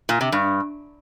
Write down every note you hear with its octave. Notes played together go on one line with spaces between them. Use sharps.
A#2
C3
G2